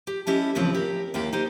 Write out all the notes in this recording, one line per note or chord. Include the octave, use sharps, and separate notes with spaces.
G4
C#4 E4 G4 A4 D#5
D#2 C#3 E3 F3 C4
G4 A#4
D#2 D#3 A#3 E4 G4 G5
D#4 G4 C5